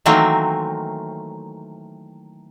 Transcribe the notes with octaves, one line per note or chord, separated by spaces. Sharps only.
D#3 E3 F#3 A3 A#3 C4